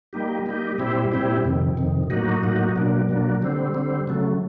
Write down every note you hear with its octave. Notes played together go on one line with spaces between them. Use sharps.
G3 A#3 D#4 G4
G3 A#3 D#4 G4
A#2 G3 C4 E4 G4
A#2 G3 C4 E4 G4
F2 C3 D#3
F2 C3 D#3
A2 F#3 A#3 D#4 F#4
A2 F#3 A#3 D#4 F#4
B2 F#3 A#3 D4
B2 F#3 A#3 D4
D3 G3 C4
D3 G3 C4
C#3 F#3 A3